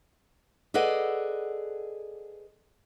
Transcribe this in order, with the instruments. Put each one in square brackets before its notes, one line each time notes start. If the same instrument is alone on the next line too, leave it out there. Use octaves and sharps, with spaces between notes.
[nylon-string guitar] G#4 A4 B4 D5 D#5 F#5